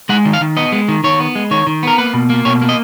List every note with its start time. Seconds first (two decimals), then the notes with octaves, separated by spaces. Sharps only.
0.09 G#3 F#5
0.25 D#3
0.33 F5
0.41 D#3
0.57 B3 D#5
0.72 G#3
0.88 D#3
1.04 D#3 C#5
1.20 B3
1.35 G#3
1.51 D#3 C#5
1.67 D#3
1.83 B3 A#4
1.98 A#3 B4
2.14 B2
2.30 A#3
2.45 B2 C#5
2.62 A#3
2.69 D#5